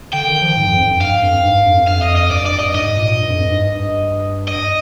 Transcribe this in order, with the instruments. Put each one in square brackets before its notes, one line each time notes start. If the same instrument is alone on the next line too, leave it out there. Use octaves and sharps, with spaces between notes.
[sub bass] D3 [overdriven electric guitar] G5
[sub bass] D#3
F3
G#2
F2
F2
G2
[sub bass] G2 [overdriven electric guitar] F5
[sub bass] G2
F2
G2
G#2
G2
F2
G2
[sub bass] F2 [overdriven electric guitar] F5
[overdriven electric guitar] D#5
D#5
[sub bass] G2 [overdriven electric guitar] D5
[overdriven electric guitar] D5
[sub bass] G2
[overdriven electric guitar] D#5
[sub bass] G#2 [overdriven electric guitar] D#5
[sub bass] A#2
G2
F2
G2
G#2
G2
[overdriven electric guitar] D#5